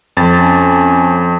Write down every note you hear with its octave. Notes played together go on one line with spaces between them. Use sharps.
F2 A6
C#4